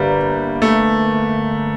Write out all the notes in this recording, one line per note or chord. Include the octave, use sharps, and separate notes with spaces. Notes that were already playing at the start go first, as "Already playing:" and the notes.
Already playing: G1 G3 A#3
A3